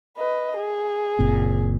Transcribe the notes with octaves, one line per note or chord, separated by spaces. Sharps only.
B4 D#5
G#4
F#1 A#2 C4